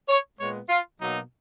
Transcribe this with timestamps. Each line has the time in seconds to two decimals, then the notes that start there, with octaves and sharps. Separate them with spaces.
0.09 C#5
0.39 A#2 G#3 B3 C#5
0.69 F4
0.99 B2 F#3 A#3 D#4